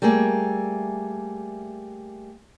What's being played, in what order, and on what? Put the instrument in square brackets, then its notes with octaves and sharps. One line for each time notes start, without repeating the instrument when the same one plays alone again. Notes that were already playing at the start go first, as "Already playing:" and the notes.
[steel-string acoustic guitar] G3 A3 A#3 G#4